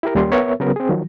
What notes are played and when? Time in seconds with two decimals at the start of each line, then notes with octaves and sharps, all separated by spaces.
0.03 E4 G4 A#4
0.15 D#2 G3 A#3 C#4 C6
0.31 B3 A#4 B4 C#5 E5
0.60 C#3 F#3 B3 A#4
0.76 C4 G#4
0.89 D#3 F3 F#3